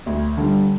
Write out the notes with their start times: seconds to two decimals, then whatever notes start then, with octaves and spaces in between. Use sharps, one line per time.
0.06 D2
0.37 D3 G3